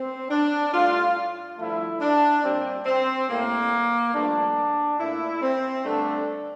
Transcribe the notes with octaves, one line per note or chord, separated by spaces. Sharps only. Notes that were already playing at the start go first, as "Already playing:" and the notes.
Already playing: C4
D4
A2 G3 F4
G2 D3 F3 A3 E4
D4
A#2 G3 C4
C4
A2 G3 A#3
G2 F3 A3 D4
A#2 A3 E4
C4
G2 D3 A3 D4